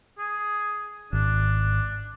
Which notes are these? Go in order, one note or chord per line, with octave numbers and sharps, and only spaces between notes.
G#4
G#1 D4